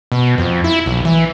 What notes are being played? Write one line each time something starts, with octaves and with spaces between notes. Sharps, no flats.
B2
F2
E4
B1
E3